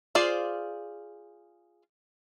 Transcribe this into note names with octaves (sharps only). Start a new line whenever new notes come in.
F4 G#4 C5 D5